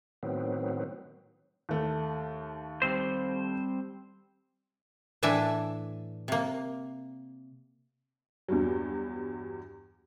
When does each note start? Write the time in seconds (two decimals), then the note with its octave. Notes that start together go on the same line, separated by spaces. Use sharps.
0.23 A2 D#3 F#3 B3 C4
1.69 D#2 A3
2.82 G3 C4 C5
5.23 A2 E3 D4 E5 G#5
6.28 C3 A#3
8.48 E2 G2 F#3